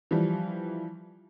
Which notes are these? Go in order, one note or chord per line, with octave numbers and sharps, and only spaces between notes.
E3 F3 G3